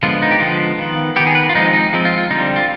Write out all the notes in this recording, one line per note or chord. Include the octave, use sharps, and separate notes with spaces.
D3 F3 G#3 B3 F4
D#4
G4
D3 F3 G#3 B3 F4
D#3 B3
D#3 B3 G4
G#4
B4
F4
F3 G#3 C4 D#4
D#4
F3 G#3 C4
F4
F4
D3 G3 C4 D#4
F4